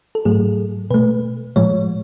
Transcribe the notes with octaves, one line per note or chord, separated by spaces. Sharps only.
A4
G#2 F#3 A3 G#4
B2 A3 B4
A2 F3 G#3 C#5